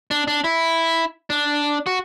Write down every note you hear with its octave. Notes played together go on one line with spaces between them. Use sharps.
D4
D4
E4
D4
F#4